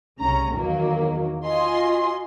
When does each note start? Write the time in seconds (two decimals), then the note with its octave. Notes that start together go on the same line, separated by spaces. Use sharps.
0.20 C2 C#3 C#4 A#5
0.53 E2 D#3 F#3 A#3
1.45 F4 F#4 D#5 G#5 C6